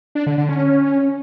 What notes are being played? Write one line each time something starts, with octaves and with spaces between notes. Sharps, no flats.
D4
D3
D3
C#4